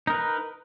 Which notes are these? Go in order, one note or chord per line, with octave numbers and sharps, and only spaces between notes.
D#4 A#4 B4